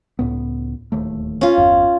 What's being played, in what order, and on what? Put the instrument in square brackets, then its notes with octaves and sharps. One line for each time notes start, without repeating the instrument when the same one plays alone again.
[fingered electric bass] C#2 A2 B3
D1 D#2 A3
[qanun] C#4 F4
[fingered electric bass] G1 E2